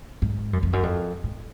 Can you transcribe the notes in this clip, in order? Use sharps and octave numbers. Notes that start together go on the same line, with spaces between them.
G#2
F#2
F2
F#2
F2
G#2